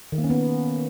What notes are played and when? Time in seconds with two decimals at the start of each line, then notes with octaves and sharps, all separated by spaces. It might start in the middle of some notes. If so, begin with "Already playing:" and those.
0.12 D#3
0.18 A#3
0.24 C#4
0.30 B3